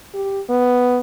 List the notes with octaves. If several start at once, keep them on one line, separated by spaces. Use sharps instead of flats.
G4
B3